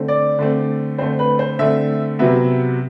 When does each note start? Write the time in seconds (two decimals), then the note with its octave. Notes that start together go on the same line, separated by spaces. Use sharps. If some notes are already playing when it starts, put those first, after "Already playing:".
Already playing: D3 A3 C4
0.08 D5
0.39 D3 A3 C4
0.98 D3 A3 C4 C5
1.19 B4
1.39 C5
1.59 D3 A3 C4 E5
2.19 C3 F#3 B3 E5